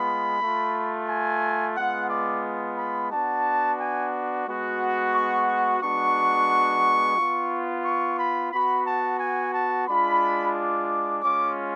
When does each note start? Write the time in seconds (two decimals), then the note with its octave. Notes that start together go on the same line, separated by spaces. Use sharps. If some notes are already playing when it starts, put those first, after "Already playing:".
Already playing: G#3 B3 F4 B5
0.42 A3 F4
1.09 G#5
1.76 G#3 B3 F4 F#5
2.10 D5
2.78 B5
3.12 B3 D4 F#4 A5
3.80 G#5
4.46 G#3 B3 F#4
5.15 C#6
5.48 C#6
5.82 G#3 B3 D4 F#4 C#6
7.17 B3 F4
7.85 C#6
8.19 B5
8.52 B3 F#4 B5
8.86 A5
9.20 G#5
9.54 A5
9.88 G#3 D4 F4 B5
10.56 D6
11.23 G#3 C#4 F4 D6